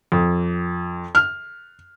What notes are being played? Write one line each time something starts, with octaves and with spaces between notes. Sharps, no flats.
F2
F6